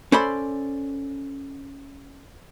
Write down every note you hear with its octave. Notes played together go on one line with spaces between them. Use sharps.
C#4 A4 C5 D5 B5 C6